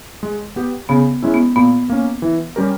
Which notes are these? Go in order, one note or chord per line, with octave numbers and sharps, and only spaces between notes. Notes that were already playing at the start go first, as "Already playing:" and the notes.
G#3
B3 G4
C#3 B3
G#3 C#4 E4
B3
A#2 B3
A#3 C#4
E3
G3 C#4 G4 A#4